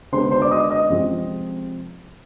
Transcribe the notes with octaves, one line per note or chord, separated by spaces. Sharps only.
D3 G#3 B3 C5 C6
C5 C6
D5 D6
D#5 D#6
D#5 D#6
C3 F3 G#3 C4